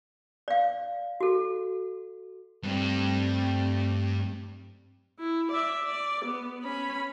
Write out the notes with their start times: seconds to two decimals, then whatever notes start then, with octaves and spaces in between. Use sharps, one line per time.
0.48 D5 F5
1.21 F#4 A4
2.63 G2 G3 A3 C4
5.19 E4
5.52 D5 E5
5.83 D5
6.25 B3
6.64 C#4 B5